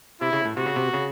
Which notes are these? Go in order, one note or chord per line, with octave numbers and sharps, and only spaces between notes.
C3 E4
C#3
A2
C3 F#4
C#3
C3
C#3